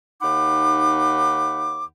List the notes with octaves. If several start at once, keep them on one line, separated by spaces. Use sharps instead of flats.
D#2 D#4 F#5 B5 D6